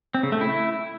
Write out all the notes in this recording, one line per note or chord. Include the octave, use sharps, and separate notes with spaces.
C4
C#3
A3
E4